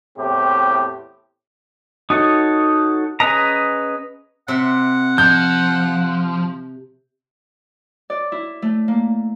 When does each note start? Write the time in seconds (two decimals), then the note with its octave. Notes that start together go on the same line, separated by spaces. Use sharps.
0.18 E2 A2 C4 G4
2.10 D#4 F#4 A4 C#5
3.20 C#4 G#4 B4 D#5 A#5
4.48 C3 E5 F#5
5.18 F3 G6
8.10 D5
8.32 E4
8.62 A3
8.88 A#3